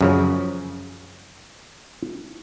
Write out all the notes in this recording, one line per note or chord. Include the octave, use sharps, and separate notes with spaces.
F#2 C#3 F3